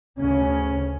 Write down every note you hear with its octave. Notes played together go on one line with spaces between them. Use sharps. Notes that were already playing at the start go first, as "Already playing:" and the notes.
D2 C#3 C#4